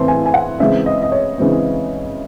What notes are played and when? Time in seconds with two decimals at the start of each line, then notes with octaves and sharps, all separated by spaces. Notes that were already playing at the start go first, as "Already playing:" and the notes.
Already playing: A2 E3 C4 A5 C6
0.08 G#5
0.26 G#5
0.34 F#5
0.60 C#3 E3 G#3 C4 E5
0.86 D#5
1.03 D#5
1.12 C#5
1.38 C#3 E3 G#3 C4